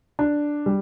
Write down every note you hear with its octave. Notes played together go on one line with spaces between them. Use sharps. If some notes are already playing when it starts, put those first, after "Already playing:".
D4
G3